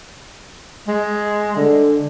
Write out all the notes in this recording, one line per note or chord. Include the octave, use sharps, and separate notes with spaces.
G#3
D3